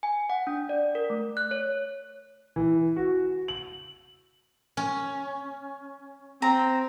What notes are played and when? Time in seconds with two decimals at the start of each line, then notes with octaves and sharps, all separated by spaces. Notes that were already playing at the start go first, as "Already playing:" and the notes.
0.03 G#5
0.30 F#5
0.47 D4
0.69 D5
0.95 A#4
1.10 A3
1.37 F#6
1.51 C#5
2.56 E3
2.96 F#4
3.48 F#7
4.77 C#4
6.42 C4 A#5